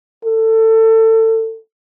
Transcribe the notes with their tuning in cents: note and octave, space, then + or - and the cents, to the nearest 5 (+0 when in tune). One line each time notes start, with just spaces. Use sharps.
A4 +25